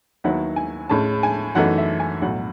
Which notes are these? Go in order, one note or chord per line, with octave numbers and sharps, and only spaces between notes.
D#2 D#3 F#3 B3 E4 F#5
G#5
A2 G#3 C#4 A5
G#5
F#2 E3 A3 D#4 F#5
E5
G#5
B1 A2 F#3 F#5